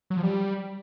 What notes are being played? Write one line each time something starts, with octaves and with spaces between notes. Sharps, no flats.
F#3
F3
G3